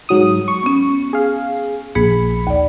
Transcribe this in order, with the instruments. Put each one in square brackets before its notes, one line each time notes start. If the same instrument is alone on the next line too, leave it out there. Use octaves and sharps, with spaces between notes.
[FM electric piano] G#2 F#3 D#6
C#6
[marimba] B3 C#4
[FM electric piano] G#4 F5
[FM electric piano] A#1 B5 C#7 [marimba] G#4
[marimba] D#2 D5